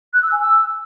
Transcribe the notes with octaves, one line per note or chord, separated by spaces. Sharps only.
F#6
E6
G#5
E6